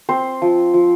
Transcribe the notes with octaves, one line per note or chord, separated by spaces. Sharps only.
C4 C5
F3
F3